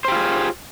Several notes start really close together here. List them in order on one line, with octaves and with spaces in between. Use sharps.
C5 G4 F4 G#4